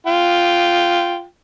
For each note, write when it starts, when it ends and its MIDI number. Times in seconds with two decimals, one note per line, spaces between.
0.07 1.24 65
0.07 1.24 79